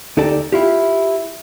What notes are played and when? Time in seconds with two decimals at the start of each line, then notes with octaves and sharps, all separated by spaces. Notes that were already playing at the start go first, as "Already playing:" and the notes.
0.17 D2 D#4 G4 A4 D5 A5
0.52 E4 F4 G4